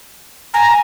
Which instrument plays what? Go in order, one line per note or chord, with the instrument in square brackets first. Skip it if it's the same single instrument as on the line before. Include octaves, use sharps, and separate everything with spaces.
[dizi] G#5 [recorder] A#5